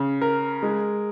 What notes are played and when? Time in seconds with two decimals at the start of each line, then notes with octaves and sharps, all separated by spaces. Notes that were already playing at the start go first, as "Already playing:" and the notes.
Already playing: C#3
0.21 A#4
0.63 G#3